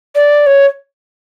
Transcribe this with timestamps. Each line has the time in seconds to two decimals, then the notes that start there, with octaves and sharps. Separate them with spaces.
0.15 D5
0.46 C#5